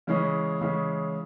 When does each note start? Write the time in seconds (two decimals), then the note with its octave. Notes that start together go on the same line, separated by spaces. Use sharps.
0.07 C#3 E3 G#3 C#4
0.61 C#3 E3 G#3 C#4